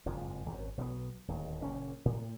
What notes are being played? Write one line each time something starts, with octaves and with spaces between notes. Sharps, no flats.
F#1 F2 G#2 F3
G#1 F#2
B1 F#3 G3 B3
D1 D#2
F#1 A#2 C#4
A2